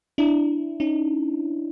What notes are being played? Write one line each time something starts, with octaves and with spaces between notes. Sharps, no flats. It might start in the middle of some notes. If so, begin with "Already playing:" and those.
D4 E4
C#4 D#4